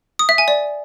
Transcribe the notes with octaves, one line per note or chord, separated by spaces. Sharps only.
D#6
E5
G#5
D5